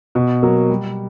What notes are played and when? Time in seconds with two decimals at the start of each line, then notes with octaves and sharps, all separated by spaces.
0.15 B2
0.42 F#3 A#3
0.70 G3